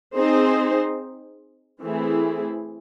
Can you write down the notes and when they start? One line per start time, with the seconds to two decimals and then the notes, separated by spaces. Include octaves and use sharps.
0.15 C4 D#4 G#4 C5
1.83 E3 A3 C4 E4 G#4